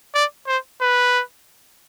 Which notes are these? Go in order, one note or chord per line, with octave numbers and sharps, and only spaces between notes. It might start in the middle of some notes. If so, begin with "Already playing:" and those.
D5
C5
B4